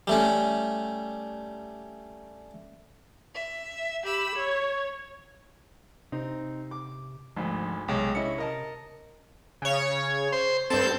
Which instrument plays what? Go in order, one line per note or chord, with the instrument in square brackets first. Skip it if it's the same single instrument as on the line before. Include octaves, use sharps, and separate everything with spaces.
[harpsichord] G3 A3 C#4
[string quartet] E5
G4 B5 E6
C#5
[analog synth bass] C3 [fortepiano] C4 D#4
[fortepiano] D6
[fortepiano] G#1 D2 [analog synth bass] F3
[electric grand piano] B1 G#3 [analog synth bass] C3 [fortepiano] C#5 G5
[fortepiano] C#4 E4 D#5 [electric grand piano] C#7
[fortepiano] A#4 D#5 A5
[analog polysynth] C#3 C#5
[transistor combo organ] C5
[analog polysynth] G2 G6 [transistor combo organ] C4 A4